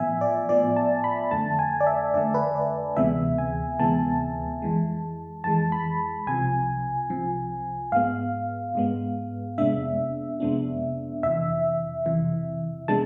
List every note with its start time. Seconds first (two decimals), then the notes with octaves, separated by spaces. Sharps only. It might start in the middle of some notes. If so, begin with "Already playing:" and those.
Already playing: A2 F3 B3 E5 G#5
0.21 D5
0.49 A2 F3 B3 D5
0.76 A5
1.04 B5
1.31 F2 D3 A3 A5
1.59 G#5
1.81 D5
1.87 E5
2.14 F2 D3 A3 D5
2.34 B4
2.55 D5
2.97 D2 C3 E3 G#3 B3 E5
3.38 G#5
3.79 D2 C3 E3 G#3 B3 A5
4.62 F2 E3 G#3
5.44 F2 E3 G#3 A5
5.72 B5
6.27 C2 C3 F3 G#5
7.10 C2 C3 F3
7.92 G#2 G#3 B3 F5
8.75 G#2 G#3 B3
9.58 F2 C3 G#3 B3 D4 E5
10.40 F2 C3 G#3 B3 D4
11.23 F2 C3 E3 E5
12.06 F2 C3 E3
12.88 C3 G#3 B3 D4 A5